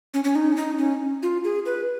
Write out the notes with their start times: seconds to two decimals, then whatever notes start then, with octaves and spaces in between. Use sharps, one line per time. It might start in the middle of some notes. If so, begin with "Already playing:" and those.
0.14 C#4
0.24 C#4
0.35 D#4
0.52 C#4
0.56 D#4
0.78 C#4
1.23 F4
1.44 G#4
1.66 B4